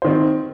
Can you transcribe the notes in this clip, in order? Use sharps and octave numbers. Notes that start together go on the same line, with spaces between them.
D#3 C4 C5